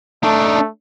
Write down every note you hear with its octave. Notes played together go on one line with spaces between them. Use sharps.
A3 D4 D#4